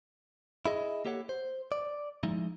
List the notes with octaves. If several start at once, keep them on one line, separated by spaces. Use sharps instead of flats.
E4 G#4 D#5
A#3 G4 A4 C#5 F#5
C5
D5
F3 G#3 D#4 E4